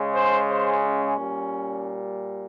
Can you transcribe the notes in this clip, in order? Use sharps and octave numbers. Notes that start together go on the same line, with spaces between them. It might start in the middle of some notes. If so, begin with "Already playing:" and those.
Already playing: C#3 G#3
C5
C5
C#4
A#2 G3